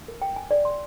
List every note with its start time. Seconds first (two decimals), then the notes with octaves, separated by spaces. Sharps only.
0.08 A#4
0.22 G5
0.36 G#5
0.51 D5
0.65 C6